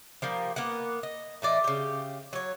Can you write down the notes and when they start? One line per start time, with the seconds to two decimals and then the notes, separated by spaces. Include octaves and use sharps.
0.22 F3 G3 A#3
0.56 A#3 B3 F#5
1.03 D#5
1.42 A2 E3 D5 D#5
1.64 C#3 G4
2.33 F#3 C#5